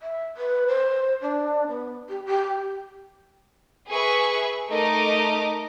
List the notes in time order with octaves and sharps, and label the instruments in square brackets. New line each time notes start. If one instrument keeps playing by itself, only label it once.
[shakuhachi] E5
B4
C5
D4
B3
G4
G4
[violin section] G#4 B4 E5 C#6
A3 D#4 A#4 D#5 A#5 D6